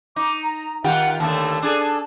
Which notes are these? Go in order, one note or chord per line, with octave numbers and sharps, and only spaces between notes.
D#4 D6
A#5
D#3 F4 G4 F#5
D#2 D3 A3 A5
D4 G#4 A4